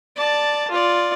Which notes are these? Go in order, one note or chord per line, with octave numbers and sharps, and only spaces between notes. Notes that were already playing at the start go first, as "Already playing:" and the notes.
D5 A5
F4 D5